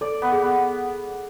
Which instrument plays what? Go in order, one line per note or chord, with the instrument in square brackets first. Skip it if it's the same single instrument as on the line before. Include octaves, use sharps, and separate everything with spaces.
[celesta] A4 [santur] D5
[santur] B3
[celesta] G#4
[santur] B3